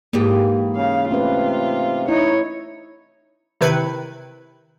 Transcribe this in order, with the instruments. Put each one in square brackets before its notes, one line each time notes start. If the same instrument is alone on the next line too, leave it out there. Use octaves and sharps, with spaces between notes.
[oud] G#2 E3 G4 [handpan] A#3 G#4
[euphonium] C#3 [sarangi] F5
[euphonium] C3 [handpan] A3 C#4 B4 [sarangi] F4
[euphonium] D#4 [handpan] E4 [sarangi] C#5
[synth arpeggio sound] C3 D#3 E4 B4 C#7